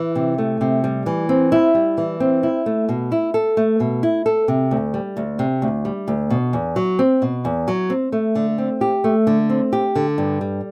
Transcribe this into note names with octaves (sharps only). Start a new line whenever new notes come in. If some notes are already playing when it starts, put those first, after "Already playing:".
Already playing: E3
C3
A3
C3
G3
E3
C4
E4
G3
E3
C4
E4
A3
B2
E4
A4
A3
B2
E4
A4
C3
D2
G3
D2
C3
D2
G3
D2
B2
E2
F#3
C4
B2
E2
F#3
C4
A3
D3
C4
G4
A3
D3
C4
G4
D3
G2
G3